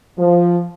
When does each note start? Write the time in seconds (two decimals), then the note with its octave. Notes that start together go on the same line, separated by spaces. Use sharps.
0.18 F3